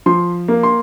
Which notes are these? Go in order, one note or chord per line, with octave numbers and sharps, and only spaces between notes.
F3 C6
A#3
C6